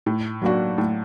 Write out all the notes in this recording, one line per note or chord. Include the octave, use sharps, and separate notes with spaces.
A2
F#3 A#3 D4 F#4
A2